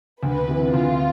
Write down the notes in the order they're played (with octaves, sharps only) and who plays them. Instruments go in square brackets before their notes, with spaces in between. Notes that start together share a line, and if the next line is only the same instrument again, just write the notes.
[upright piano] D2 [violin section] B4
[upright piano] C3 E3
[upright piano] D2 [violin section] F4